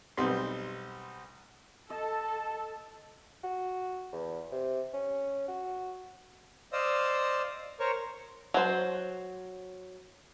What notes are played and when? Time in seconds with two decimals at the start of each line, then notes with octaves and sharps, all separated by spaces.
0.17 B1 G3 C4 C6
1.90 A4 D#5 A5
3.44 F#4
4.12 E2
4.52 C3
4.94 C#4
5.48 F#4
6.72 C5 D5 D#5 F5 D#6 E6
7.80 A#4 C5 C#5 C#6
8.54 F#3 C5